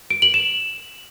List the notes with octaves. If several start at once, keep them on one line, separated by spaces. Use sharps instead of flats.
D7
F#7
E7